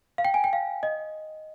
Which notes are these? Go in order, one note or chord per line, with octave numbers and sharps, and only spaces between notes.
F5
G5
G#5
G5
F5
D#5